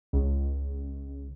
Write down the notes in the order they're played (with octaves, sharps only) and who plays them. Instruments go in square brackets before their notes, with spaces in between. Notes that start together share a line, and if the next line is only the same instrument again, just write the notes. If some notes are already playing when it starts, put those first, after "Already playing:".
[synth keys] C#2